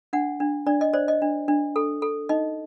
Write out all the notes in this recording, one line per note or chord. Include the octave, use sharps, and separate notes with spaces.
D4 F#5
D4
D4 D5
D#5
C5 D5
D#5
D4
D4
A4
A4
D#4 D#5